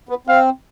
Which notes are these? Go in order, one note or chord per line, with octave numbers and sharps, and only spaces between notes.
B3
C4 F5